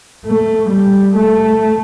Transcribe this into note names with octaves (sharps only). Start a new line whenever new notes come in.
A3
G3
A3